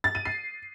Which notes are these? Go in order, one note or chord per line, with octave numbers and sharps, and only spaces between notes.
A6
D#7
C7